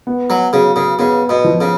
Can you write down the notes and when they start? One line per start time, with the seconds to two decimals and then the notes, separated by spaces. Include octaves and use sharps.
0.07 B3
0.30 F#3
0.53 C#3 F#3
0.76 C#3
0.99 C#3 B3
1.29 B2
1.44 F3
1.61 C#3